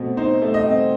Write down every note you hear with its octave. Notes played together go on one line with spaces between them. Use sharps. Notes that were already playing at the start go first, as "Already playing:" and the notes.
Already playing: B2 A3 C4
D#4 C5
A3
D#5
C4